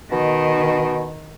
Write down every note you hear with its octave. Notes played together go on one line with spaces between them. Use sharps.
B2 D#3